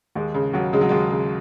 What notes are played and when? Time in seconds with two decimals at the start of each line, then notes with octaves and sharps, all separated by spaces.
0.15 D#2 G#3
0.34 C#3
0.53 D#2 F#3
0.73 C#3 G#3
0.81 F#3
0.89 D#2 G#3
1.11 C#3